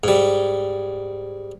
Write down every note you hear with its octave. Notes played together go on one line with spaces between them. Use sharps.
G#2 G3